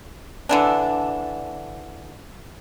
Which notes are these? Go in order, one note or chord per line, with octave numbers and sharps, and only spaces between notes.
D3 E3 D4